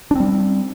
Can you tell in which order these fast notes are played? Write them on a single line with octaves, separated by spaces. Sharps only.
D4 C4 G3